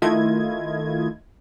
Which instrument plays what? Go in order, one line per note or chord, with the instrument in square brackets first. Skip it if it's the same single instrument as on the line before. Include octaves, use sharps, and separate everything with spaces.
[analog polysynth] D#3 A3 E4 F4 D#5 G#6